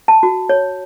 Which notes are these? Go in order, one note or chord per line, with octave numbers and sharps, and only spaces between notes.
A5
F#4
C#5